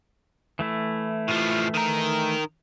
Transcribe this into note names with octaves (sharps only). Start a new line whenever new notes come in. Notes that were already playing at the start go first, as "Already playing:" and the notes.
E3 A3 E4
A2 F3
D#3 A#4